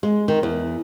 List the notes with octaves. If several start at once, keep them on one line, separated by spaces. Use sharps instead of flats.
G#3
D#3
E2